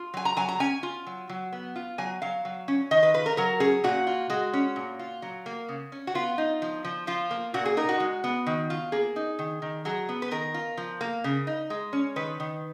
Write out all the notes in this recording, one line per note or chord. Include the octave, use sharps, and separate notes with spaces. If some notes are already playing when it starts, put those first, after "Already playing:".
Already playing: F4
F#3 G#5
A#5
F#3 G#5
A#5
C#4 G#5
F4
F#3
F#3
B3
F4
F#3 G#5
F#3 F5
F#3
C#4
D#3 D#5
B4
F4 B4
A#4
F#3 A#4
C#4 G#4
A#2 F#4
F4
G#3 F#4
C#4
A#2
F4
F#3
A#3
C#3
C#4
F#4
B3 F4
D#4
F3
F3
F3 F4
A#3
A#2 F#4
G#4
D#4 A#4
F#4
G#3
B3
D#3
F4
A#3 G#4
D#4
D#3
D#3
F#3 G#4
B3
B4
D#3 A#4
F4
F3
A#3
C#3
D#4
G#3
C#4
D#3 B4
D#3